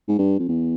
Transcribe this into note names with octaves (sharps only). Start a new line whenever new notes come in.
G#2
G2
F2
E2